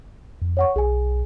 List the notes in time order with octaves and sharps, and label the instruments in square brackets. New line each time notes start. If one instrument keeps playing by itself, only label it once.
[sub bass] F2
[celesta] C#5 F#5 C#6
[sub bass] B1 [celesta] G#4 G#5